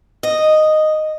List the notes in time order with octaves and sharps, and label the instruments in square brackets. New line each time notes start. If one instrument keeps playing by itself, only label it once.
[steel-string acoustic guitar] D#5